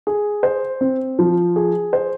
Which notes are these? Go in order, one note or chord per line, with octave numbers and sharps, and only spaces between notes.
G#4
C5
C4
F3
G#4
C5